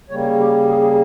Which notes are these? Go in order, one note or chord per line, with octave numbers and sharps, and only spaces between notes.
C#3 G3 A#3 C#5
G4
G#4
G#4